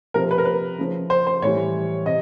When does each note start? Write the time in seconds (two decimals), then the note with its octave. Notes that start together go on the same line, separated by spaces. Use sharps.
0.14 C3 F3 A#4
0.31 B4
0.38 A#4
0.45 B4
0.78 C#3 F3
1.10 C5
1.27 C5
1.42 A2 E3 G3 C#5
2.06 C3 D#5